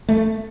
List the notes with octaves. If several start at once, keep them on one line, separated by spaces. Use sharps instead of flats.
A3